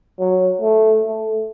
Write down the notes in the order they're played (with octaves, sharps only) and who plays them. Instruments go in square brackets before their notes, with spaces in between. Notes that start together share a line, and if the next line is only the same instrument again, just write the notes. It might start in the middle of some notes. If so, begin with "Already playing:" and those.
[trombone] F#3
A3
A3